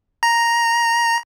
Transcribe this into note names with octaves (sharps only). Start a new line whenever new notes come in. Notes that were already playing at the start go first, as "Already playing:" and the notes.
A#5